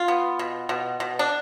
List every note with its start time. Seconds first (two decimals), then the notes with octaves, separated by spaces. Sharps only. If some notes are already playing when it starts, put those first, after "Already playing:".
Already playing: F4
0.08 B3
0.39 B2
0.69 B2
1.00 B2
1.19 D4